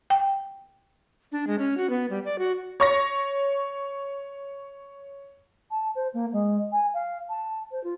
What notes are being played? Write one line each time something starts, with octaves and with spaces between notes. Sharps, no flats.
G5
D4
G#3
C#4
F#4
B3
G3
D5
F#4
C#5 C#6 A#6
A5
C5
A#3
G#3
G#5
F5
A5
C5
F4